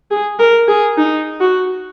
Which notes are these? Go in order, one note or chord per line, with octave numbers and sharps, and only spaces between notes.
G#4
A#4
G#4
D#4
F#4